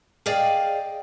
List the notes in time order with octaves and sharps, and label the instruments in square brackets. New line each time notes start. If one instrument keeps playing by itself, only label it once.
[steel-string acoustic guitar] G#4 D5 D#5 F5 G5